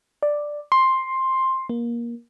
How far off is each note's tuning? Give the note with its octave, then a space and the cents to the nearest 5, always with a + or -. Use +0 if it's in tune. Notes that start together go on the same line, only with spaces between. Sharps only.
D5 +5
C6 +10
A#3 +20